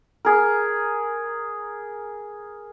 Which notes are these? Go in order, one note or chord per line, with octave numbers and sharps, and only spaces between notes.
G#4 A#4